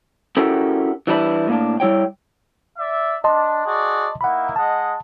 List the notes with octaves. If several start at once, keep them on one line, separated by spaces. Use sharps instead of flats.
C#4 E4 F#4 G4 A4 A#4
E3 G3 D4 E4 B4
A2 A#3 D4
G3 E4 C#5 G5
D5 E5
D4 D#5 A5 C6
F#4 G#4 D5
A#3 D#4 E4 F#5 B5
G#3 D#5 F#5 A5